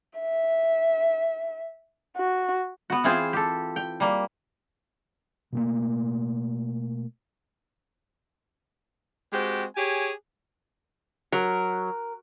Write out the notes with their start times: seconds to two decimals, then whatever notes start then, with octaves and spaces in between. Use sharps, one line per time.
0.20 E5
2.17 F#4
2.90 B3 F#4
3.04 E3 C4 F4 G#4 C5
3.33 G4 A4
3.76 G5
4.00 G3 A#3
5.52 B2 A3 A#3
9.33 G#3 C4 F#4 G4
9.76 G4 G#4 C#5 G#5
11.32 F#3 A#4